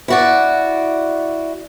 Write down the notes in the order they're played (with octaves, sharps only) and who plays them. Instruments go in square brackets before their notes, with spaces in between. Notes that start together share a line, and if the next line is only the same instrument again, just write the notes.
[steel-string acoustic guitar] E4 F#4 D5